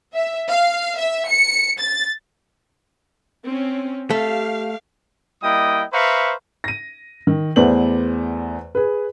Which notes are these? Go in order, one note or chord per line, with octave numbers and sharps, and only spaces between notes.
E5
F5
E5
C#7
A6
C4 C#4
A3 G4 F5
G3 A#3 E4 D#5 G5 D#6
B4 C5 E5 F5 A#5 C#6
A#6 D#7
D#3
E2 A3 B3 C5 D5 F#7
G#4 B4